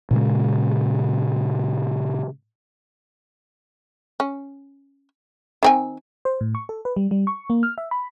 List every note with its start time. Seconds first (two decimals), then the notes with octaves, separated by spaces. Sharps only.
0.11 A#2 C#3 G#3
4.20 C#4
5.63 D#3 C4 G#5
6.25 C5
6.41 A2
6.55 C#6
6.69 A4
6.85 B4
6.96 G3
7.11 G3
7.27 C#6
7.50 A#3
7.63 F6
7.78 E5
7.91 B5